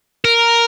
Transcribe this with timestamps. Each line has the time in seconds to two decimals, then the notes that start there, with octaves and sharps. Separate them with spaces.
0.25 A#4